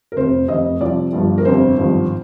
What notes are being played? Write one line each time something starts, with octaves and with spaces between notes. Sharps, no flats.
A#4
F1 F2 C3 C5
F1 F2 C3 D#5
C2 C3 F3 C4 D5
G1 G2 F3
A#4
G1 F2 C3 C5
G#1 G2 F3